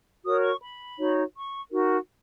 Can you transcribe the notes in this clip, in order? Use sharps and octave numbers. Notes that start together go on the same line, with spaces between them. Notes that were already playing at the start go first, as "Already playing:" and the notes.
F#4 A#4 C#5 D#6
C#6
B5
D#4 F#4 C#5
C#6
D#4 F#4 A#4